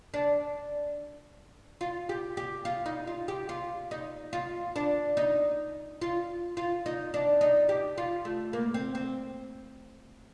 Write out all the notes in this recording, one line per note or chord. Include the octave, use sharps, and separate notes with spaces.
D4
F4
G4
G4
F4
D#4
F4
G4
F4
D#4
F4
D4
D#4
F4
F4
D#4
D4
D#4
G4
F4
A3
A#3
C4
C4